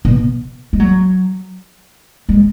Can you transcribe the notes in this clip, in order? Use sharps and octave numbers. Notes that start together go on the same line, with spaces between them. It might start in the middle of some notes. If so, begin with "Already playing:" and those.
B2
G#3
F#3
G#3